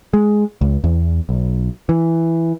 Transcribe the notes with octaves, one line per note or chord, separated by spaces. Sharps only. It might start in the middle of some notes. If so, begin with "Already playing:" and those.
G#3
C#2
E2
B1
E3